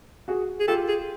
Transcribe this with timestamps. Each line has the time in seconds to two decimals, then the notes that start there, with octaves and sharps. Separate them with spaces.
0.28 F#4 G#4
0.60 G#4
0.68 F4 G4 A4
0.88 G#4